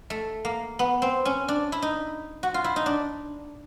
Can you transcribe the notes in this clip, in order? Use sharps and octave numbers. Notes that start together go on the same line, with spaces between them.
A3
A#3
B3
C4
C#4
D4
E4
D#4
F#4
F4
E4
D#4
D4